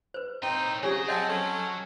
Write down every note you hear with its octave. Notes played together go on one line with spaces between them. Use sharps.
B4 C5
A2 C4 D#4 G5
C#3 F#3 G4 G#4 C#5 A#5
C4 D#5 F#5 A5
C#4 A4